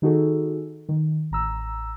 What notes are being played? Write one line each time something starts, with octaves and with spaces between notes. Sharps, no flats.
D#3 D#4 F#4 G#4 A4
D#3
A1 A#5 E6